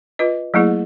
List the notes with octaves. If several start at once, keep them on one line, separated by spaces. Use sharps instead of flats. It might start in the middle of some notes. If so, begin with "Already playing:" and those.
F4 B4 D#5
F#3 A3 A#3 E4 G#4